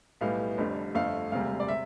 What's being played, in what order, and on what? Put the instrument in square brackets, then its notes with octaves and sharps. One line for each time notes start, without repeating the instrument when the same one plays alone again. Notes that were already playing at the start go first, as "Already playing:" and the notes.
[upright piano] B1 A2 G3 B3 F5
F1 F2 D3 G3
G1 F2 D3 A3 F5
E1 D2 C3 G3 F5
D5
C3 E5